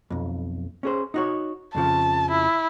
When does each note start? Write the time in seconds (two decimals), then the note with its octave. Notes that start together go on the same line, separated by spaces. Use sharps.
0.10 B1 F2
0.83 C#4 G#4 C5
1.14 D#4 F#4 C#5
1.75 F2 C#3 F3 A5
2.30 E4